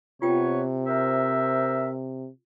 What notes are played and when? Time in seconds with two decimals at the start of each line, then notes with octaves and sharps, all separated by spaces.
0.22 C3 B3 F4 B4 C#5 G5
0.85 A#4 C5 E5